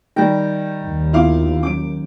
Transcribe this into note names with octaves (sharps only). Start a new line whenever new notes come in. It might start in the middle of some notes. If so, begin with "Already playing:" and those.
D#3 G3 D#5 G5 G6
D#2
B3 E4 F4 F5 D6
F#3 C#4 D6 D7